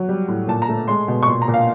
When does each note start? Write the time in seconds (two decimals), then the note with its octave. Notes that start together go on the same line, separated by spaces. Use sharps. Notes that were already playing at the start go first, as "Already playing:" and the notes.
Already playing: F#3
0.09 G3
0.28 A2
0.48 A#2 A5
0.62 A#5
0.69 A3
0.88 G#3 C6
1.08 B2
1.23 C#6
1.28 A#2 C6
1.42 A#5
1.48 A#2
1.54 F5